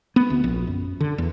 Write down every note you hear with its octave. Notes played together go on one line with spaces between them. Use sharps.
B3
D2
A#1
F#2
D3
E2